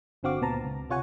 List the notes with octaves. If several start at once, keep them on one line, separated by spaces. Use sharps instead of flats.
G1 D3 C4 F#4 F5 D6
C#2 A#2 B3 C4 A5 A#5
C#2
C3 F4 C#5 F#5 G#5